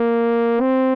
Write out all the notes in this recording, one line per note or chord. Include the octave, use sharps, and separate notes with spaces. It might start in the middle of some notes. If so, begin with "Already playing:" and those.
Already playing: A#3
C4